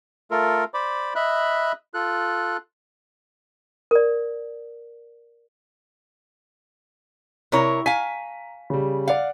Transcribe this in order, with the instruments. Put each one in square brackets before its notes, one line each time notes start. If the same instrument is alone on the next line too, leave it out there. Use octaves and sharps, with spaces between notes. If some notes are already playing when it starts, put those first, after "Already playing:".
[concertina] A3 F4 A4 A#4
C5 D5 B5 D6
D#5 E5 B5 F#6
F4 A4 F#6
[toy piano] A#4 D5
[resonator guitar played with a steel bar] C3 A#4 C#5 [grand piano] E4
[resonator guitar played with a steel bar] F5 G#5 [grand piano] A#5 B6
[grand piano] C#3 G3
[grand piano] D5 F#5 [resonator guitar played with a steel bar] F5